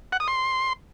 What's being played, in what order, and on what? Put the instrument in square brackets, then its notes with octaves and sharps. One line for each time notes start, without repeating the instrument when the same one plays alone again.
[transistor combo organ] F#5
D#6
C6